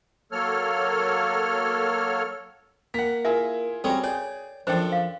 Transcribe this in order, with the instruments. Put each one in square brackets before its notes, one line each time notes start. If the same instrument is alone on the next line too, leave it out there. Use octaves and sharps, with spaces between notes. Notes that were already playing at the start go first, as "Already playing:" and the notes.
[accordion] F#3 A#3 A4 C#5 F6
[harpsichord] A#3 [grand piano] F#5 B6
[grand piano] E4 F4 G#4 [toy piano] A#4 E5
[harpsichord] G3 C4 C#4 [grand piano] F#4 G#4 C#5 [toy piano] A4
[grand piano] G#4 [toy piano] C#5 [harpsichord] D5 G5
[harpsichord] F#2 F3 [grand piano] D4 A4 D5 [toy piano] C5 G5
[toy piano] F5